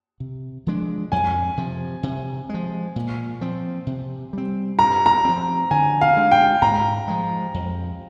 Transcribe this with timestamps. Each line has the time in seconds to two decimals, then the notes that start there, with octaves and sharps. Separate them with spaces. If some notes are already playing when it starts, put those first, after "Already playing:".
0.20 C3
0.67 F3 G#3 D4
1.12 F2 G#5
1.57 C3 F3
2.03 C3
2.49 F3 G#3
2.96 A#2
3.41 F3 C4
3.87 C3
4.33 G3 C4
4.79 G2 A#5
5.06 A#5
5.25 F3 C4
5.71 D3 G#5
6.01 F5
6.17 G#3 D4
6.31 G5
6.62 G#2 A#5
7.08 F3 G#3
7.54 F2